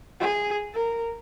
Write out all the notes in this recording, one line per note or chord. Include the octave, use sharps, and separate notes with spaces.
G#4
A#4